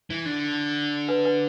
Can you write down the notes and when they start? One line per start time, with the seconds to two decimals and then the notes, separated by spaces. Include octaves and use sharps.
0.10 E3
0.25 D3
1.09 B4
1.25 B4